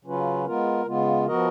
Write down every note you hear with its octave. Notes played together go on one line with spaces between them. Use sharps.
C#3 F#3 C#4 F4 B4
G#3 B3 F4 A#4
C#3 G#3 B3 F4
F3 B3 F#4 A#4 D#5